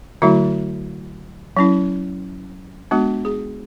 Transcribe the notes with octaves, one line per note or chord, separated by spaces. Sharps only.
D3 F#3 A3 E4 F#4
F#3 C#4 E4
G#3 B3 D4 F#4
G#4